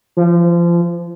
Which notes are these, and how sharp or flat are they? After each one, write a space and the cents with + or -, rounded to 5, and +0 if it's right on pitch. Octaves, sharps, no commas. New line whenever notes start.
F3 -30